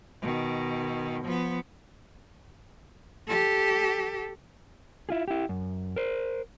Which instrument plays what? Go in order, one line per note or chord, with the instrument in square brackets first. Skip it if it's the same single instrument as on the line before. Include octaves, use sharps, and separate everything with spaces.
[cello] B2 D#3
F3 B3
G4 A4
[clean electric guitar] E4 F4 G#4
E4 G4
F#2
A#4 C5